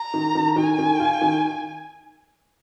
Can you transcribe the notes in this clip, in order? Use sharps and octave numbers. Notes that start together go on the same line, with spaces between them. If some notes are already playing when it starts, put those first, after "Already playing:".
Already playing: A#5
D#3
D#3
D#3 G#5
D#3
F4
D#3